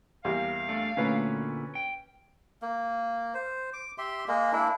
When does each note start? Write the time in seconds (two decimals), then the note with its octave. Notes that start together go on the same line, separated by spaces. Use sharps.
0.25 E2 G3 A#3 F5
0.69 A3 D4
0.97 D2 A#2 A3 C#4 B4
1.75 G5
2.62 A#3
3.34 C5
3.73 D6
3.98 G4 E5 C6
4.28 G#3 A#3
4.53 A#3 D4 E4